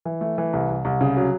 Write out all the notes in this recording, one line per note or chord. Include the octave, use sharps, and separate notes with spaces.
E3
A3
E3
C2
C2
C2
C#3
F#3